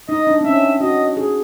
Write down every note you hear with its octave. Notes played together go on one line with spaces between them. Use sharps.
D#4 D#5
D4
C4
C#4 E5
F#4 D#5
G#4